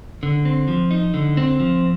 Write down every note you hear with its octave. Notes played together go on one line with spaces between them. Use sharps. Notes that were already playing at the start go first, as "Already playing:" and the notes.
D3
C4
F3
D#4
D3
C4
F3